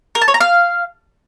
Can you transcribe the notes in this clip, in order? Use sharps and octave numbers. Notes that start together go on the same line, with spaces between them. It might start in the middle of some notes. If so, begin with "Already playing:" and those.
A#4
A5
C#5
A#5
F5